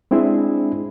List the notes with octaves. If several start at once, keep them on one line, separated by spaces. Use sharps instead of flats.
G#3 C4 D4 E4 G#4